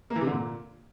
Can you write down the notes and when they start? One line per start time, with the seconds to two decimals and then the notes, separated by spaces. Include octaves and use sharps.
0.10 A#3
0.16 E3
0.21 C3
0.26 D3
0.32 A#2